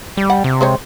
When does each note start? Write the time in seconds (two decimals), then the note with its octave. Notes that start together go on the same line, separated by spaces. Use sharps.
0.17 G3
0.30 F#5
0.44 C3
0.61 G#3 C5 C#5